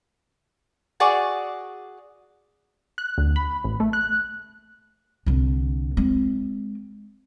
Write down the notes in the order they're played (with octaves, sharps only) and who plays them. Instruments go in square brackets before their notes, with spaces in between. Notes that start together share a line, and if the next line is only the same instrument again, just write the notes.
[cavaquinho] F#4 G#4 D5 C#6
[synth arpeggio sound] F#6
D2
B5
A1
A3
F#6
[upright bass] C2 D3
G#3 C4